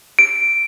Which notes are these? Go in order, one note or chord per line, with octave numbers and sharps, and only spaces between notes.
D7